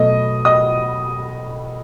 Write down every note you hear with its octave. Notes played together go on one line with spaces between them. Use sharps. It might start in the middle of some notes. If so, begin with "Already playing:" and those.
Already playing: B2 F#3 A3 D#5 D#6
D#5 D#6